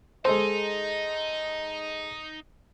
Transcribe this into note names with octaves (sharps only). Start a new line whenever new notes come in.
G#3 D#4 A4 C5 D#5 C6